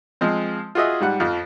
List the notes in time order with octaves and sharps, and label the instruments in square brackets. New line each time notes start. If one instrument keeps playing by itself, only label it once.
[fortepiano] F3 G#3 C4
F4 F#4 G#4 D#5 E5
G#2 G3 F#5
F2 F3